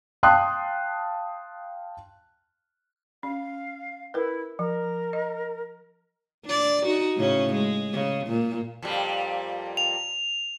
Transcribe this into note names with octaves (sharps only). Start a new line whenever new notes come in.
F5 G5 A5 C6 D#6 F#6
C#4 F5
E4 A#4 B4
F3 A#4
D#5
D4 D5
D#4 F#4
A2 C#3 C#4
G#3
C#3
A#2
F2 A#2 G3
F7